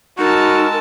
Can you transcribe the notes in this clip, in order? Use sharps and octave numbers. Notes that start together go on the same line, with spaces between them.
G#3 D#4 F#4 A#4 A5 E6